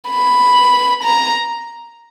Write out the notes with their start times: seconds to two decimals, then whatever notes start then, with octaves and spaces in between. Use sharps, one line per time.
0.10 B5
1.04 A#5